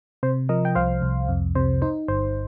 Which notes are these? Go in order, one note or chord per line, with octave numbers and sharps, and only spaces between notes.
C3 C5
F3 A#4 D#5
G5
C2 C5 F5
C2
F2
C3 C5
D#4 C5
G1 C5